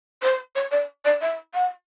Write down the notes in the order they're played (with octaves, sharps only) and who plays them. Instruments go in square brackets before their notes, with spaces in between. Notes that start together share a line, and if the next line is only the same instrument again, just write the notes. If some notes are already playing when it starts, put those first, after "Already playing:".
[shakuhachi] C5
C#5
D5
D5
E5
F#5